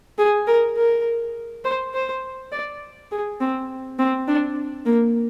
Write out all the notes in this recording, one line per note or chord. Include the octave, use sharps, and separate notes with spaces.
G#4
A#4
A#4
C5
C5
D5
G#4
C4
C4
D4
A#3